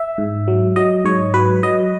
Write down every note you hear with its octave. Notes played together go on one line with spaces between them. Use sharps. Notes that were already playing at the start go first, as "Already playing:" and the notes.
Already playing: E5
G#2
F#3
F#3 D#5
G#2 C#5
F#3 B4
F#3 D#5